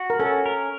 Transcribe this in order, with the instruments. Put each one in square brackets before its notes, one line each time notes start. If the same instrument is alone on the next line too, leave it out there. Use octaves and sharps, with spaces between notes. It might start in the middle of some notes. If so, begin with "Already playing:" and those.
Already playing: [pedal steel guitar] F#4
[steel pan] A#4
[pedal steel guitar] C#4 [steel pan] A4
[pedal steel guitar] A#4